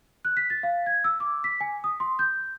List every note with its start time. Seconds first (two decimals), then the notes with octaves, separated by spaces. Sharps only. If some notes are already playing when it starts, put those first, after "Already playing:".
0.25 F#6
0.37 B6
0.50 A6
0.63 F5
0.86 G#6
1.04 E6
1.20 D6
1.44 B6
1.61 G#5
1.84 D#6
2.00 C6
2.19 G6